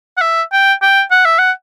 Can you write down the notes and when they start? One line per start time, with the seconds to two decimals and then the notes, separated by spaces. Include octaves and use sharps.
0.17 F#5
0.21 E5
0.52 G5
0.82 G5
1.11 F#5
1.25 E5
1.39 F#5